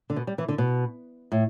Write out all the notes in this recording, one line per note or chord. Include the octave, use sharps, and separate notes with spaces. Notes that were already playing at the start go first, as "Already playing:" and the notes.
D3
B2
G3
E3
D3
B2
A2